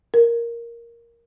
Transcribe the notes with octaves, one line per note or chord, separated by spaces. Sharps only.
A#4